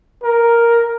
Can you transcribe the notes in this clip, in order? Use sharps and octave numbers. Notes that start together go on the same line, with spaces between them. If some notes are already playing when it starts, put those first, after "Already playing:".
A#4